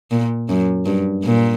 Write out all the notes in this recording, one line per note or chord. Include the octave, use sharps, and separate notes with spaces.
A#2
F#2
G2
A#2